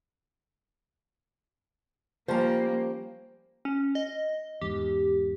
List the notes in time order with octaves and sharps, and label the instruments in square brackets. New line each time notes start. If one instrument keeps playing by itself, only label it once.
[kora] F3 G3 C#4 [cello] A#3 [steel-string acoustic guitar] C5 A5 A#5
[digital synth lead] C#4
D#5
[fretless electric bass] E2 G#2 [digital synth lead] G4